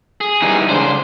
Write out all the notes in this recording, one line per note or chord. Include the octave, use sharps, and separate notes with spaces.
G#4
E3 G3 D#4
C#3 G#3 D4 C5